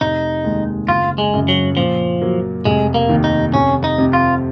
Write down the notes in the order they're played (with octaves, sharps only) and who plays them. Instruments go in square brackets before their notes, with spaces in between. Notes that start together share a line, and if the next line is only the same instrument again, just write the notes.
[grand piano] F1 [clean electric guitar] D#4
[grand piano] D#2 D#3 G#3
[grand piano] F#1 [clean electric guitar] F4
[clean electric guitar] G#3
[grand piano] F#2 C#3
[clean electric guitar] F#3
[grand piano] A#2 [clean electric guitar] F3
[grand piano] F#3 A#3
[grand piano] F1 [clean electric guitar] G#3
[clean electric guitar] A#3
[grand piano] D#2 D#3
[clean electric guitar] D#4
[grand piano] F1 [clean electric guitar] C#4
[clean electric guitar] D#4
[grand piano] F2 C3
[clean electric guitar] F4